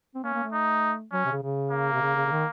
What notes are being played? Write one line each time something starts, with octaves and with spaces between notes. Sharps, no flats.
C4
A#3 C#4
A#3
A3
D#4
F#3 C#4
C3
C#3
C#3
A#3
C3
C#3
C#3
C#3
D#3